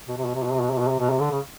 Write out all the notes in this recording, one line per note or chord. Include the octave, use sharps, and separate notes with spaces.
B2
C3
B2
C3
B2
C3
B2
C3
B2
C3
B2
C3
D3
C#3